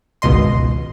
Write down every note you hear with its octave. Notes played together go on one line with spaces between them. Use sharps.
G#1 C#2 B2 D#5 C6